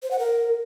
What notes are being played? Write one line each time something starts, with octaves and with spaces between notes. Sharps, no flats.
C5
F#5
A#4